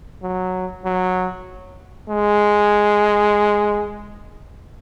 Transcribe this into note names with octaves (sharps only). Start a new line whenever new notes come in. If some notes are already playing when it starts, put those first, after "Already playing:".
F#3
F#3
G#3